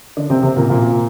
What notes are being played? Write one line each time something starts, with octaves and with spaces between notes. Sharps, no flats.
D3 D4
C3 C4
C3 C4
A#2 A#3
A#2 A#3